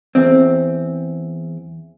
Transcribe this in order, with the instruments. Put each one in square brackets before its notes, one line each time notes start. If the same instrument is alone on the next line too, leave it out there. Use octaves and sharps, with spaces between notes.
[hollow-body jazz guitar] E2 C4